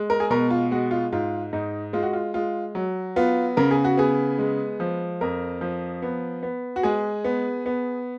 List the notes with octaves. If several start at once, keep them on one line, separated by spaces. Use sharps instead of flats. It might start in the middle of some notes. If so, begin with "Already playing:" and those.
Already playing: G#3
A#4
G#4
B2 A#4
F4
G#3 F#4
F4
G#2 F4
G#2 D#4
G#3 F4
F#4
F4
G#3 F4
F#3
B3 F4
C#3 A#4
G#4
F#4
B3 G#4
G#3
F3
F2 A#4
F3
B3
B3
F#4
G#3 G#4
B3
B3